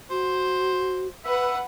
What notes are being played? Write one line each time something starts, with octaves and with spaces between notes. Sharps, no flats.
F#4 C5
B4 E5 F#5